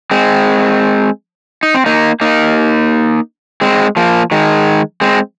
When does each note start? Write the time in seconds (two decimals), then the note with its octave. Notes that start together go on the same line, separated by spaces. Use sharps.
0.11 G#3 C4
1.63 D#4
1.74 C4
1.86 A#3 D#4
2.21 A#3 D#4
3.61 G#3 C4
3.97 F3 A#3
4.31 D#3 G#3
5.01 G#3 C4